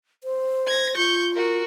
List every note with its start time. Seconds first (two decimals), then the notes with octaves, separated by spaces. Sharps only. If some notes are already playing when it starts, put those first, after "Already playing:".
0.24 C5
0.67 G#6 A#6
0.97 F4 C#6 G6
1.35 F#4 A#4